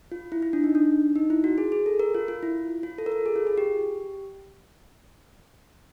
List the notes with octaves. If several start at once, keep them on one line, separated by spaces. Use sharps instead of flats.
F4
E4
E4
D4
D#4
D4
D#4
E4
F#4
G#4
G#4
A4
A#4
F4
F4
E4
F4
A4
A#4
A4
G#4
F4
G#4
G4